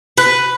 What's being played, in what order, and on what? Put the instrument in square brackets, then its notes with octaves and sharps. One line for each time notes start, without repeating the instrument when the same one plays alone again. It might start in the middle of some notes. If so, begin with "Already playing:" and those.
[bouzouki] B4